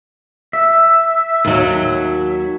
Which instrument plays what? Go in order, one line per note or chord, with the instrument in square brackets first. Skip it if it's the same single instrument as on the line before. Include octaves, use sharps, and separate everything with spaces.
[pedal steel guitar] E5
[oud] D#2 F#3